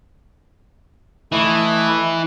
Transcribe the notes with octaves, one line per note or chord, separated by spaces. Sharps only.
E3 A3 E4 D#5